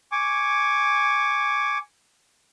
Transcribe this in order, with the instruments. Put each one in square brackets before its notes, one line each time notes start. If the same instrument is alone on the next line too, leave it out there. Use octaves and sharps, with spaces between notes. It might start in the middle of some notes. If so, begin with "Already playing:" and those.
[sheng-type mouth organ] G#5 C#6 D6